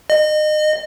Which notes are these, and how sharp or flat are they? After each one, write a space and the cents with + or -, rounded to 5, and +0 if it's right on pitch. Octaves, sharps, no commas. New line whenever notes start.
D#5 -30